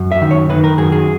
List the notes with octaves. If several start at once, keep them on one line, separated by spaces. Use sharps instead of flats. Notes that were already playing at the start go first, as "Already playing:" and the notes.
Already playing: F#2
E5
D#3
C#5
D#3 B4
A#4
F#2 G#4
G#4